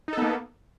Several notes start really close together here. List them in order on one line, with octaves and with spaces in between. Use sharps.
D#4 A4 B3 A#3